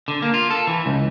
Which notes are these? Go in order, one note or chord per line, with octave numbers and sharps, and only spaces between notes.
D3
A#3
F4
A4
E3
C#2